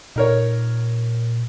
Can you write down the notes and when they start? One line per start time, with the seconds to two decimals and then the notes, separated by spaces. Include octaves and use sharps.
0.16 A#2 D#4 A#4 C#5